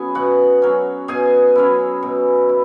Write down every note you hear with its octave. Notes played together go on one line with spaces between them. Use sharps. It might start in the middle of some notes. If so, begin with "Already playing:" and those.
Already playing: F#3 B3 C#4 G#4 B4 G#5
B2 F#4 F#5
F#3 C#4
B2 G#4 G#5
F#3 C#4 E4
B2
E4